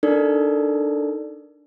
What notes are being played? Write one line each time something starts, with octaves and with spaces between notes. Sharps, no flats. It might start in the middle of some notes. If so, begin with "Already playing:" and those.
D4 D#4 A4 A#4 D5